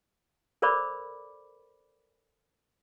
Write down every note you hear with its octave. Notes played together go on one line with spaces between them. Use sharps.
A4 A#4 C5 D5 B5 D6